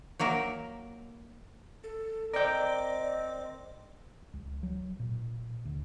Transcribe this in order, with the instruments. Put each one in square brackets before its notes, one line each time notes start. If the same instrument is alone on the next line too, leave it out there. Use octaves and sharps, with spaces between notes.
[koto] F#3 A#3 A#4 E5
[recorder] A4
[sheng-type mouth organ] C4 [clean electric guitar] A#4 G5 [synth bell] D5 [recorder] D#5
[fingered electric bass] C#2
F#3
A#2
D2